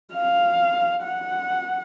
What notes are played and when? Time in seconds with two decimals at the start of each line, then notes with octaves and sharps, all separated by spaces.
0.14 F5
1.03 F#5